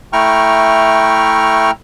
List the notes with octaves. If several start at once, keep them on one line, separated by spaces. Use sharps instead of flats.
A3 E4 G5 A#5 C#6 F6